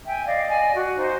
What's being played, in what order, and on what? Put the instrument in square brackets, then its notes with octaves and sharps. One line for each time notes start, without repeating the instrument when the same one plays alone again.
[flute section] E5 G5 G#5
[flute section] D5 D#5 [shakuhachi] F5
[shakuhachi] G#5
F#4
[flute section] D#4 C5